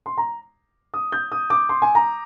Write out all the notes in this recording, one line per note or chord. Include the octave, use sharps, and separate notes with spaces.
C6
A#5
D#6
G6
D#6
D6
C6
G#5
A#5